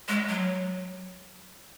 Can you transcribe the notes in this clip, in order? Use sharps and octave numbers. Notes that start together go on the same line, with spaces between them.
G#3
F#3